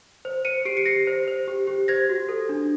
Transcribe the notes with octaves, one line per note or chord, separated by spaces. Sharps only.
C5
C5 C#7 D#7
G4 C7 D7
C#7
G4 A#6 C7
C5
C5
G4
G4
C5 G#6 A#6
F#4
A4
D4